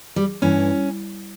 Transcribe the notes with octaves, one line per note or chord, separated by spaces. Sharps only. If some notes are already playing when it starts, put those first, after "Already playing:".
G3
G2 E3 C#4